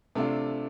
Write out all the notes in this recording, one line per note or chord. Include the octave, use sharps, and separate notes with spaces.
C3 A3 D4 F4